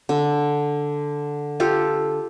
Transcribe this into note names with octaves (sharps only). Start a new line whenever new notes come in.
D3
F4 G4 A4